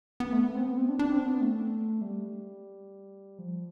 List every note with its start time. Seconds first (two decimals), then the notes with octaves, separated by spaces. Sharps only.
0.20 B3
0.33 A3
0.44 B3
0.55 C4
0.65 B3
0.77 C4
0.89 D4
0.99 D4
1.12 C4
1.26 B3
1.41 A3
2.01 G3
3.39 F3